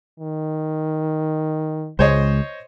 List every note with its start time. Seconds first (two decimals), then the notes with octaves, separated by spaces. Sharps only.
0.20 D#3
1.99 C#2 G#3 C5 C#5 D#5